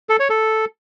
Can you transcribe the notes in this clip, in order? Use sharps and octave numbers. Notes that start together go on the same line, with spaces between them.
A4
C#5
A4